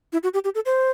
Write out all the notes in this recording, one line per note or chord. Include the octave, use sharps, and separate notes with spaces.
E4
F#4
G4
G4
A4
C5